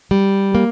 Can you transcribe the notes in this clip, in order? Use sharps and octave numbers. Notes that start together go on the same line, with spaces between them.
G3
A#3